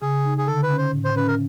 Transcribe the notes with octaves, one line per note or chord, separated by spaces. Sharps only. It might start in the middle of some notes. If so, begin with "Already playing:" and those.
C#3 G#4
D#4
G#4
D3 A4
B4
C#4
C5
A2
C5
C#4 B4
A#4